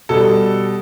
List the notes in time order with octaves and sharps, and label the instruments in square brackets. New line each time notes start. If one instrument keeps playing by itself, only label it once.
[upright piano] B2 G3 A4